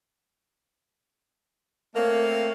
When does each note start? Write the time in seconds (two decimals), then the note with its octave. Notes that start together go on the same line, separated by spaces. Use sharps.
1.95 A3 A#3 C4 C#5 F5